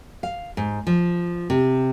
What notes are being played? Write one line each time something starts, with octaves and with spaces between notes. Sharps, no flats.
F5
G#2
F3
C3